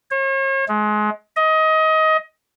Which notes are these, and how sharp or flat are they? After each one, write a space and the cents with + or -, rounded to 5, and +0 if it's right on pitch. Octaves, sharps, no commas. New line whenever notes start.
C#5 -40
G#3 +30
D#5 +20